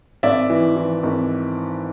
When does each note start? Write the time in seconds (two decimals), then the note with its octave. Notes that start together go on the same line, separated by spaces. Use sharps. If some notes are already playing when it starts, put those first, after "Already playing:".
0.23 G#1 D5 E5
0.50 E3
0.76 E3
1.03 G#1